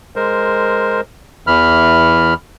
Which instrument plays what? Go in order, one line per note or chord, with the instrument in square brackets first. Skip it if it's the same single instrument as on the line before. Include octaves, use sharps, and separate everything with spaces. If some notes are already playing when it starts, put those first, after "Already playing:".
[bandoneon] G#3 A#4 C5
E2 E3 B5 F6